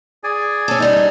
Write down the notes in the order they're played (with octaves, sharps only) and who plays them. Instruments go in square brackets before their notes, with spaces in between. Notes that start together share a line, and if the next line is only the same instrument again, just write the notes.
[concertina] G#4 D5 G#5
[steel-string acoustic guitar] C#4 A4
G3 D#4